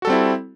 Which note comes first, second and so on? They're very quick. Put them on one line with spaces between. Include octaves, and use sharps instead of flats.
F#4 A4 G3 C4 E4